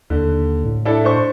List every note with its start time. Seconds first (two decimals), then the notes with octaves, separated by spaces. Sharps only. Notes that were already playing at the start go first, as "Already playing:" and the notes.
0.10 D#2 D3
0.65 A2
0.86 D4 E4 A4
1.04 D4 C5 C#6